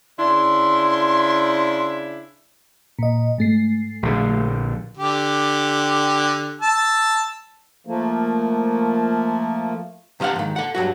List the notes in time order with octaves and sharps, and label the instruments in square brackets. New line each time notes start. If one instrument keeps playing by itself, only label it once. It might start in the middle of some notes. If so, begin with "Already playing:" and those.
[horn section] C#3 D4 E4 [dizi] C6
[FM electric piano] A#2 D#5
G#2 A3 C7
[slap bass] A#1 D3
[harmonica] D3 G4
A5 E6
[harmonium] F3 A3 A#3
[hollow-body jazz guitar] C3 F3 C5 F5 F#5
G#2 D#3
A4 F#5
G2 F#3 F#4